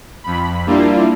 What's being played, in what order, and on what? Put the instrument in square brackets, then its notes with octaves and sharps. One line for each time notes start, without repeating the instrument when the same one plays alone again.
[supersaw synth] F2 B5
G3 A#3 D4 E4 F4